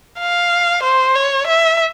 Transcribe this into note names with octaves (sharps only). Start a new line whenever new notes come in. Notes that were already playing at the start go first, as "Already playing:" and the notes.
F5
C5
C#5
E5